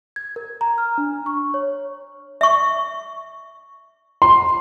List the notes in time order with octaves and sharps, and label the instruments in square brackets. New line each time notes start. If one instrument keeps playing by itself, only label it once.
[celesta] G#6
A#4
A#5
F6
D4
C#6
C#5
[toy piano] E5 C#6
[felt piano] C6